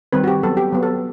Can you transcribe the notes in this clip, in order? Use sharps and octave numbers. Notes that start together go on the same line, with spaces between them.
D#3 G3 C4 B4
F#4
G4
F#3 B3 A4
G4
F#3 B3
A4